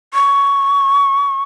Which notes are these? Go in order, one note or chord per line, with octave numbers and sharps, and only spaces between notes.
C#6